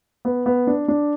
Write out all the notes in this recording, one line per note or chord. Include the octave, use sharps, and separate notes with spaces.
B3
B3
D4
D4